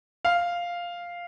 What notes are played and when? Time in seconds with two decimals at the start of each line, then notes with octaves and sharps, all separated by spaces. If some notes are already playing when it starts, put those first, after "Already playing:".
0.25 F5